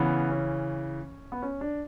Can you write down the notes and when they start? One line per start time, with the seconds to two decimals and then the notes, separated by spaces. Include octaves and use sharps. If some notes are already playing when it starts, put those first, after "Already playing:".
Already playing: C#3 E3 B3
0.31 C#4
1.32 B3
1.42 C#4
1.61 D4